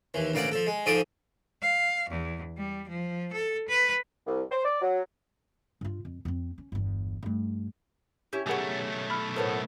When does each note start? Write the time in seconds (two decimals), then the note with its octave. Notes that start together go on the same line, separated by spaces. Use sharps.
0.14 D#2 E3
0.34 A1 D2 A#3 D5 F#5 D6
0.52 F3 A4
0.67 G#3
0.86 G#2 F3 A4 D5 D6 D#6
1.62 F5
2.09 E2
2.57 G3
2.88 F3
3.33 A4
3.68 B4
4.27 C2
4.51 C5
4.65 D5
4.82 F#3
5.81 G2 F4
6.05 F2
6.25 F2 C4
6.58 C#4
6.72 G1 E2
7.23 G2 A3
8.33 C#4 E4 G4 G6
8.46 B1 C#3 A3 G4 G#4 A#4 C#5 F#5
9.10 B5 F6
9.36 A2 B3 A#4 C5 C#5 A5